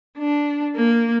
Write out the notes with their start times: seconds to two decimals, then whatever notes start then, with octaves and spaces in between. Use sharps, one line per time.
0.18 D4
0.76 A#3